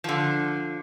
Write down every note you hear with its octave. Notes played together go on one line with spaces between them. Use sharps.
D3 F3